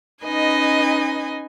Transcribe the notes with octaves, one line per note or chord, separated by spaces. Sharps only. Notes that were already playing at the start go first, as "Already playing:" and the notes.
C#4 D#4 B4 D#5 G#5